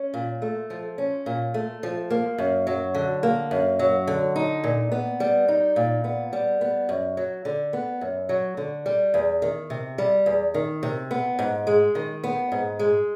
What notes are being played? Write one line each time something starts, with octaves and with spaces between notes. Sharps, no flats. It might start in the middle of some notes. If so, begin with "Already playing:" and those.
Already playing: C#4
A#2
A3
F3
C#4
A#2
A3
F3
A#3
F#2
F#3
D3
A#3
F#2
F#3
D3
D#4
A#2
B3
G3
D#4
A#2
B3
G3
B3
F#2
F#3
D3
B3
F#2
F#3
D3
G3
E2
D#3
C3
G3
E2
D#3
C3
B3
G#2
G#3
D#3
B3
G#2
G#3